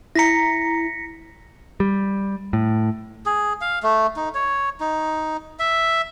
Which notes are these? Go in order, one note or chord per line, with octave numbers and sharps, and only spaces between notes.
E4 A#5 A#6 B6 C#7
G3
A2
G#4
F5
A3
D#4
C#5
D#4
E5